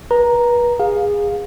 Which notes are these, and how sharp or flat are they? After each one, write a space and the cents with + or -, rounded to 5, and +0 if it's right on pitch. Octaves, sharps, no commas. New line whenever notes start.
B4 -35 A#5 +0
G#4 -20 F5 +20